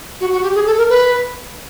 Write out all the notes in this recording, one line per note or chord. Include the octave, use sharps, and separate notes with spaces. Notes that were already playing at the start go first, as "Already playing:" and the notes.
F#4
F#4
G4
G#4
A4
A#4
B4